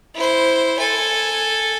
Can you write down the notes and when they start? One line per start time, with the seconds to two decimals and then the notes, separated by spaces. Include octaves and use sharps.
0.15 E4 C5
0.79 A4 G#5